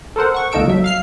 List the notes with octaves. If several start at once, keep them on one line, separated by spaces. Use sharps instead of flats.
A4 A#4 C5 F#5
F#5 C#6
C#2 A#3 D#4 A4 E6 D7
F#3 E5
F5 F6 C7